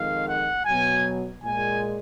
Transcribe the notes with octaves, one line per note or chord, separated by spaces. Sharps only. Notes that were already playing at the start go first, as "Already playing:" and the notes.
Already playing: F2 D#3 G#3 F5
F#5
B2 F#3 G#5
A#2 G#3 G#5